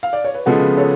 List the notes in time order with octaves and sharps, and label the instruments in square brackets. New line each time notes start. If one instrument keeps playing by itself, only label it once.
[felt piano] F5
D5
C#5
B4
[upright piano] C#3 F3 G#3 B3 [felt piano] F#4 A4
[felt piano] A4 C#5